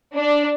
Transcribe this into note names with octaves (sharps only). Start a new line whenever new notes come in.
D4